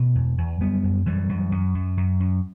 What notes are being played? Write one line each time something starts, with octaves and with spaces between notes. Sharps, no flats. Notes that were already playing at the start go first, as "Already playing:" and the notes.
Already playing: B2 A3
E2
E2
F#2 G3 B3
F#2
F#2 E3 G3
F#2
F#2
F#2
F#2
F#2